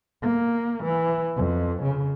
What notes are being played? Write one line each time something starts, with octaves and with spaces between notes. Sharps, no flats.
A#3
E3
F2
C#3